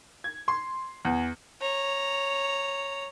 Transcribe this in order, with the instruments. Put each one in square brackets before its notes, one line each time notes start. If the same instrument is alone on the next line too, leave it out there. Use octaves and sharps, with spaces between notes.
[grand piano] G#6
C6
E2
[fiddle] C#5 A#5